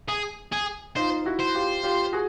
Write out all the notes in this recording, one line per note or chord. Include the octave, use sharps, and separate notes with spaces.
G#4
G#4
D#4 F4 C5
E4 F#4
C5
F4 G4
F4 G4
F#4 G#4